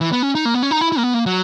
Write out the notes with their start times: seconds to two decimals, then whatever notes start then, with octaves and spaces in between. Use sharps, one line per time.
0.01 E3
0.12 B3
0.23 C#4
0.35 D#4
0.45 A#3
0.54 B3
0.62 C#4
0.71 D#4
0.81 E4
0.92 E4
0.98 A#3
1.03 B3
1.14 A#3
1.26 F#3